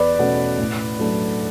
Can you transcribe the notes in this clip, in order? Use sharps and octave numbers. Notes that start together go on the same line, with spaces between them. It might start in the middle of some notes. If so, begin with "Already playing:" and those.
Already playing: E2 B4 D5
B2 A3 C#4
A2
F#3 A3 D4